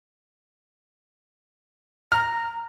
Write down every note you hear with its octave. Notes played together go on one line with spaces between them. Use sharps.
A#5 F6